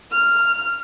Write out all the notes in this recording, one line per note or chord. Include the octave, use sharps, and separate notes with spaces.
F6